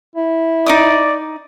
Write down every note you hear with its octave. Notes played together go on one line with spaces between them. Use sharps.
E4
D#4 D5 D6 D#6